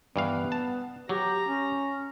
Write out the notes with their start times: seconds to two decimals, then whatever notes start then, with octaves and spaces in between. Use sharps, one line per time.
0.16 G2 E3 B3 F5
0.52 A5
1.09 F#3 G4 A#5
1.46 C#4